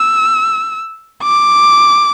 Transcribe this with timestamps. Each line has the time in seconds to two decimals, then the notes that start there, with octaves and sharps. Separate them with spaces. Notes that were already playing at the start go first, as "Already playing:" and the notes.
Already playing: E6
1.23 D6